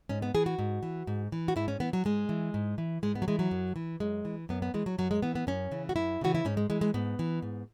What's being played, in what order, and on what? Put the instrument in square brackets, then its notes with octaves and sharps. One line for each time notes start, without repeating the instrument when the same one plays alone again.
[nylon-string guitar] G#2 C#4
B3
E3 G#4
F#4
G#2
E3
G#2
E3
F#4
G#2 E4
C#4
E3 B3
F#3
G#2 G#3
E3
G#2
E3
G#2 G#3
B3
F#3
E3 G#3
F#3
F#2
E3
F#2 G#3
E3
F#2 B3
B3
E3 G#3
F#3
F#2 F#3
G#3
E3 B3
B3
F#2 C#4
C#3 E3
F#4
F#2 E4
C#3 E3 F#4
E4
G#2 C#4
G#3
E3 G#3
G#3
G#2 B3
E3
G#2